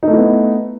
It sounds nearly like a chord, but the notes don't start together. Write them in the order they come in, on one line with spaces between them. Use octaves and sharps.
D#4 A3 E4 B3